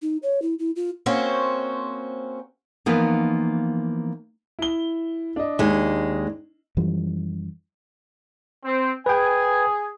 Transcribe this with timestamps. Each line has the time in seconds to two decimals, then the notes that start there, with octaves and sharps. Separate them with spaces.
0.02 D#4
0.23 C#5
0.42 E4
0.59 E4
0.76 F4
1.06 A#3 C4 C#4 F#4 C5
2.86 E3 F3 A#3 B3 D#4
4.59 E4 G7
5.36 D4 D#5
5.59 D#2 G#3
6.77 F#2 E3 F3 G3
8.64 C4
9.06 G#4 B4 G5 G#5